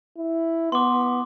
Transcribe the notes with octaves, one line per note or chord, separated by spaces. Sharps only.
E4
B3 C6 D6